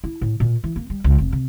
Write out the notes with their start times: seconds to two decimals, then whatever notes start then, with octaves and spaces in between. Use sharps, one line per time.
0.04 E4
0.21 A2
0.40 A#2
0.64 E3
0.76 A#3
0.90 G3
1.04 C#2
1.18 F1
1.32 C3